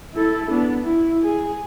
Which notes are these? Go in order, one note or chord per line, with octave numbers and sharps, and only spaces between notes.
E4 A4
B3 D4
E4
G#4